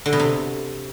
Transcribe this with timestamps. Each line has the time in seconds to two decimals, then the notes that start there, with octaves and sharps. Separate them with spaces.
0.06 D3
0.13 B2
0.19 C3